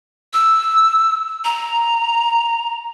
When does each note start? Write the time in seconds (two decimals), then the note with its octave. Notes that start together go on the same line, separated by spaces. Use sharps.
0.33 E6
1.44 A#5